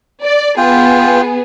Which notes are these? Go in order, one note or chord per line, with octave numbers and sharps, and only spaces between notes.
D5
B3 F4 G#4 G5